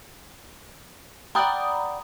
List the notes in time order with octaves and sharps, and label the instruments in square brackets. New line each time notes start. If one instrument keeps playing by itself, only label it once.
[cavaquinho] D5 F#5 G5 [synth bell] A#5 B5 D#6